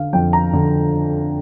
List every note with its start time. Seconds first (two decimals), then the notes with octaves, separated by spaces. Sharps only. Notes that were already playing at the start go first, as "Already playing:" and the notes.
Already playing: D3 F5
0.13 F2 G5
0.33 A#5
0.53 D3